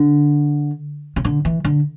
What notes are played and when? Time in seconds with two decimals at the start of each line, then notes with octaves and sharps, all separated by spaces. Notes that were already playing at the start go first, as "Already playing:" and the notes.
Already playing: D3
1.16 C#3
1.25 D3
1.45 E3
1.65 D3